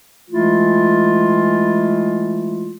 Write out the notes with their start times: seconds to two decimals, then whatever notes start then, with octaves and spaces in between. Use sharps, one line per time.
0.30 E3 G#3 A3 E4 F4